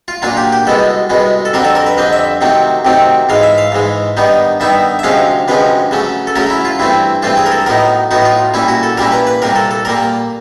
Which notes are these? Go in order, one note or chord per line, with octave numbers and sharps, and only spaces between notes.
F4
A#2 F#3 A#3 D4 F4
G4
G4
C2 B2 G#3 B3 A4
C2 B2 G#3 B3
A4
F2 D3 G3 C4 A#4
A4
A#4
B4
F2 D3 G3 C4 D#5
E5
C3 D#3 F#3 A3 C4
C3 D#3 F#3 A3 C4
G#2 E3 G#3 F5
E5
F5
G#2 E3 G#3
G2 D#3 G3 B3 D#4
G2 D#3 G3 B3 D#4 E5
E5
D2 C3 F3 G#3 C#4 F5
D2 C3 F3 G#3 C#4 B4
C#3 F#3 A3 C#4
A4
C#3 F#3 A3 C#4 A#4
E4
F4
G2 E3 A3 C4 E4
G2 E3 A3 C4 F4
G#4
A#4
A4
A2 F#3 B3 D#4 A#4
A2 F#3 B3 D#4 F#4
F4
A#2 G3 A#3 C#4 E4
F#4
A4
A#2 G3 A#3 C#4 E4 A#4
B4
B4
C2 A#2 G3 A#3 A#4
A4
A4
A#2 G3 A#3 A#4